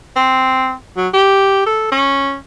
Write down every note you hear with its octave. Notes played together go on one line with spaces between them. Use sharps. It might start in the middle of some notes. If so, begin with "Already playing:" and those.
C4
F#3
G4
A4
C#4